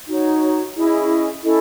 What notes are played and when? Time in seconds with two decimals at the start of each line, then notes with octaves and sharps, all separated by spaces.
0.08 D#4 F#4 C#5
0.75 C#4 E4 G#4 D#5
1.42 C#4 E4 A4 D#5